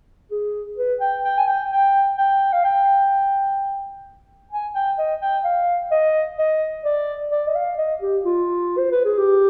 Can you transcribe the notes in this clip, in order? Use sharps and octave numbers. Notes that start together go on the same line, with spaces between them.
G#4
B4
G5
G5
G#5
G5
G5
G5
F5
G5
G#5
G5
D#5
G5
F5
D#5
D#5
D5
D5
D#5
F5
D#5
G4
F4
C5
B4
G#4
G4